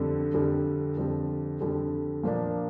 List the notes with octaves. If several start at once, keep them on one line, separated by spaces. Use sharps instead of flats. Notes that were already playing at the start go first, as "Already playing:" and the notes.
Already playing: F2 D3 G3
F2 D3 G3
F2 D3 G3
F2 D3 G3
A#2 F3 A#3 D4